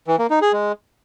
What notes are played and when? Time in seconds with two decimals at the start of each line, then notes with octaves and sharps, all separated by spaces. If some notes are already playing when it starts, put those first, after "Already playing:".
0.08 E3
0.19 A#3
0.30 D#4
0.42 G#4
0.53 G#3